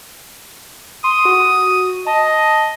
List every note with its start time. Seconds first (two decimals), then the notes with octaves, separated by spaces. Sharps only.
1.04 C6 D#6
1.25 F#4
2.06 D#5 A5